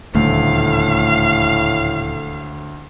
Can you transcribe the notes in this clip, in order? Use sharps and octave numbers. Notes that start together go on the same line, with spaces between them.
D#1 D2 A2 A3 F5